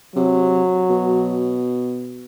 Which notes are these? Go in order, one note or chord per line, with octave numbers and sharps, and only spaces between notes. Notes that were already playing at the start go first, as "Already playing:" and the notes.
C3 F#3
B2